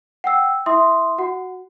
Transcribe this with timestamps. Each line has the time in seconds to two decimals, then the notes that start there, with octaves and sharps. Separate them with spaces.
0.24 F#5 G5 E6
0.66 E4 E5 C6 D#6
1.18 F#4 F#5